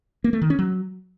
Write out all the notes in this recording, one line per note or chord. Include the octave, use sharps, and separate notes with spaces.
A#3
A3
D#3
C#4
F#3